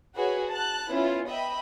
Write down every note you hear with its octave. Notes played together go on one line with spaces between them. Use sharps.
F#4 G#4 B4 C#5
A5 F#6
B3 C#4 E4 F4
D#5 E5 G5 B5